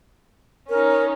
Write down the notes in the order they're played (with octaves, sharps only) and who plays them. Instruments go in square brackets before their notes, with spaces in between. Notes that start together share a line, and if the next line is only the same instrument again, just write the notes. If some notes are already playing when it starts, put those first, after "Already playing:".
[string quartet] C#4 D#4 [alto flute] A#4